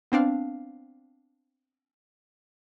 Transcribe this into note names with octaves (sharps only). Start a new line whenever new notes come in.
B3 C4 D4 F5